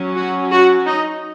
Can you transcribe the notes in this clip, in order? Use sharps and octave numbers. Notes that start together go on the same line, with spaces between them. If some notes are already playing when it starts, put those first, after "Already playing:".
Already playing: F#3 C#4
F#4
F#4
D#4